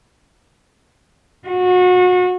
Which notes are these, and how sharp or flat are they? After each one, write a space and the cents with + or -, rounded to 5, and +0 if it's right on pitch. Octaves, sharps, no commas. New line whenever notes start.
F#4 -30